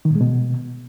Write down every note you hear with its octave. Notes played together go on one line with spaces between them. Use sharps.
D#3
A#2
G#3
B2